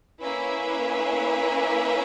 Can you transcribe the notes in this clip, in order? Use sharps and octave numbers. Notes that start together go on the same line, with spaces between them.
A#3 C#4 E4 B4 E5